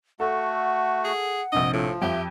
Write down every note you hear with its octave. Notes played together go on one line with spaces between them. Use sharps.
A3 F#4 A4 F#5
G#4
A#1 C3 D4 D#5
A2 F3 F4
F2 G4 E5 G7